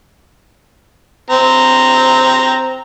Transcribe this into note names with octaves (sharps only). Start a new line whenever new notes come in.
C4 A#5